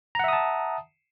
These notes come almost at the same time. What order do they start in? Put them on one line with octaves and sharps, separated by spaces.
A#5 F#5 E5 D#6 A5